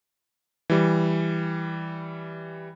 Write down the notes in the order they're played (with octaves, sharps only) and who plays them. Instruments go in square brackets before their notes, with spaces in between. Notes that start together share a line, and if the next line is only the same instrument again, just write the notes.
[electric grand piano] E3 G3